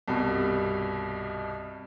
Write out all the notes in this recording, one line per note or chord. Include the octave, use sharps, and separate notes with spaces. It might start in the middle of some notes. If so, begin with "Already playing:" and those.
C2 G2 B2